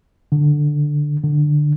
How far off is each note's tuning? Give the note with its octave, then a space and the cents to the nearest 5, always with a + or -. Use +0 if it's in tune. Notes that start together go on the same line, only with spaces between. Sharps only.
D3 +5
D3 +15